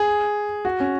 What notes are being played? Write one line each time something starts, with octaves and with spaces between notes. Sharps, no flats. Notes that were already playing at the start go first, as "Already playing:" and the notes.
Already playing: G#4
F#4
C#4